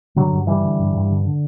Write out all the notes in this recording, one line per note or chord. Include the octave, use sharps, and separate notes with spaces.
G2 D3 F#3
G2
D3 E3 G3
D3
G2
G2
D3
D3